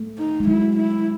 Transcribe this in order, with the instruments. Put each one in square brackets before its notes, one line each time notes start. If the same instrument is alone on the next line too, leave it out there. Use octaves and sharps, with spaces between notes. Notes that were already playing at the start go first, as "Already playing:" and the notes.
Already playing: [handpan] A3
[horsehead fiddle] D#4
[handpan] G#3
[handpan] F#3 [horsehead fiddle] E4
[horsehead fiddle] E4